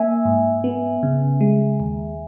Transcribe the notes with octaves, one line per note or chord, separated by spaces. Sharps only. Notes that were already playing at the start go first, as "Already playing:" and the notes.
Already playing: A#3 E5 G#5
G#2
B3
C#3
G#3
D#2